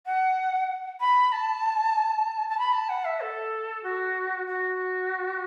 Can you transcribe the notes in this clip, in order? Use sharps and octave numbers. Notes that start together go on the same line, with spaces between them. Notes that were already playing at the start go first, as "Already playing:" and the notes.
F#5
B5
A5
A5
B5
A5
F#5
E5
A4
F#4
F#4